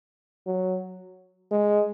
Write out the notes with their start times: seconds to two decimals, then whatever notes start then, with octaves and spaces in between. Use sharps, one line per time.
0.47 F#3
1.51 G#3